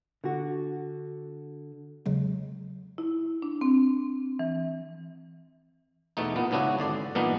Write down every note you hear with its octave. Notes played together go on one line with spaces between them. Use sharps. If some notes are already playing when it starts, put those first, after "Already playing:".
D3 F#4
E2 C#3 F#3 G#3
E4
D4
C4
E3
E2 B2 A3 D#4
A#2 B3
G#2 C#3 B3 D4 E4 F#4
G#1 D3 D5
G2 A#2 E3 B3 D4 D#4